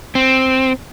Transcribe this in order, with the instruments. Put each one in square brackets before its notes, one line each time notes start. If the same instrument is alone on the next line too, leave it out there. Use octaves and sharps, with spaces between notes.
[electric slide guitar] C4